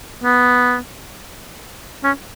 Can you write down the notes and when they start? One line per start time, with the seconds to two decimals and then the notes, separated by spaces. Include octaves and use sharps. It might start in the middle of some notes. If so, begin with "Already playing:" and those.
0.24 B3
2.04 C#4